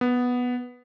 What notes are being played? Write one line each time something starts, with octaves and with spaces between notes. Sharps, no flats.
B3